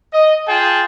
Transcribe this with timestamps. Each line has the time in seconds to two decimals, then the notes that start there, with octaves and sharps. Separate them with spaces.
0.13 D#5
0.48 F4 G#4 G5 A5